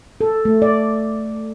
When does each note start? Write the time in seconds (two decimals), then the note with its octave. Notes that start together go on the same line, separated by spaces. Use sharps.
0.21 A4
0.45 A3
0.62 D5